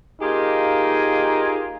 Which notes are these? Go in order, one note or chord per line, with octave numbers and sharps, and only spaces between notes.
A#3 D#4 F4 G4 G#4